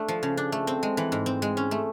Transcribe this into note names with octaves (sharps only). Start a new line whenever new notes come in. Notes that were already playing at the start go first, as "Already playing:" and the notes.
Already playing: A3 D4
F3
C#3
D4
A3
C4
G#3
E3
G#2
C4
G#3
C#4
A3